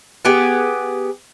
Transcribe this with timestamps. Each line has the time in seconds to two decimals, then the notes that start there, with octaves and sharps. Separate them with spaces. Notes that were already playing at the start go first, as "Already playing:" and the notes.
0.25 B3 G4 G#4